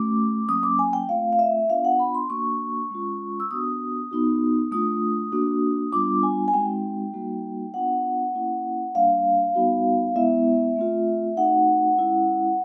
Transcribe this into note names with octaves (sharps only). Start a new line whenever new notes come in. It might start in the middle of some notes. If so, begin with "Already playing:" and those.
Already playing: A3 C#4 F#4 D6
F#3 A#3 C#4 D#6
D6
G#5
G5
A3 C4 F4 F5
F5
E5
B3 D4 F4 F5
F#5
B5
C6
A#3 D4 F#4 C#6
G#3 C#4 F4
E6
B3 D4 F#4 D#6
B3 D#4 F#4
A3 D4 F4 D#6
A#3 D4 F#4
G3 B3 D4 F4 D6
G#5
G#5
G#3 C4 D#4 F#4 G5
G3 A#3 D#4 F#4
B3 D4 F4 F#5
A#3 C#4 E4
G3 A#3 D4 F5
G3 B3 D#4 F#4
G#3 B3 E4 E5
A3 C4 F4
A3 C4 D#4 F#4 F#5
G#3 C#4 E4